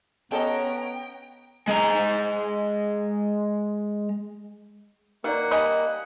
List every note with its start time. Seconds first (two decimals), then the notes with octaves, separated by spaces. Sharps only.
0.32 G3 B3 C#4 A4 D#5 G5 A#5
1.68 G#3 A#5
5.24 D#3 A#3 B4 D5 F#5
5.51 G3 D#5 G#5 B5